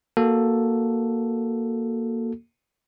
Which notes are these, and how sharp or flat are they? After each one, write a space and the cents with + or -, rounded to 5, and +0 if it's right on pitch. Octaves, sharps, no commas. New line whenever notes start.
A#3 +0 F#4 +0 A4 +5